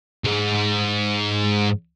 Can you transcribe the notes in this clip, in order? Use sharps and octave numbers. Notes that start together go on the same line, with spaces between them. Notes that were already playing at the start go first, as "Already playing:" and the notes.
C#2 G#2